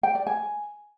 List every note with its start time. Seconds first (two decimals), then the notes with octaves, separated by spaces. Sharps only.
0.03 G5
0.15 D5
0.27 G#5